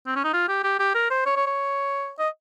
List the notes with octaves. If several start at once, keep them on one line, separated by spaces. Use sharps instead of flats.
C4
C#4
D#4
F4
G4
G4
G4
A#4
C5
C#5
C#5
C#5
D#5